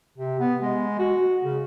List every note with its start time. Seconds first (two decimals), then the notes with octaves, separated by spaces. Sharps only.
0.18 C3
0.40 B3
0.62 G#3
0.99 F#4
1.44 C#3